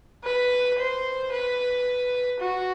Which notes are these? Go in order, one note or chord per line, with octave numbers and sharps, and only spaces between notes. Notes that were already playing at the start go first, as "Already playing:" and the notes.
B4
C5
B4
F#4